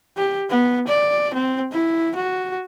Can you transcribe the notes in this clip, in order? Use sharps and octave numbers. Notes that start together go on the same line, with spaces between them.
G4
B3
D5
C4
E4
F#4